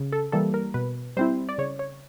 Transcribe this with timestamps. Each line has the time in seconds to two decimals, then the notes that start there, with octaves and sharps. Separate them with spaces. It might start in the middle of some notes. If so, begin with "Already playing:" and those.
Already playing: C#3
0.12 A4
0.32 E3 G3 A#3 A4
0.54 A#4
0.74 B2 B4
1.17 G3 C4 E4 C5
1.49 D5
1.58 C#3 C#5
1.79 C#5